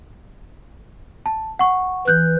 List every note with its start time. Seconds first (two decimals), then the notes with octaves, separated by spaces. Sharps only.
1.26 A5
1.59 F#5 C#6
2.08 E3 F#6 G6